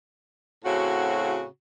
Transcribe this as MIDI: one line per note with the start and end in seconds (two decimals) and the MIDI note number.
0.65 1.45 45
0.65 1.45 49
0.65 1.45 60
0.65 1.45 66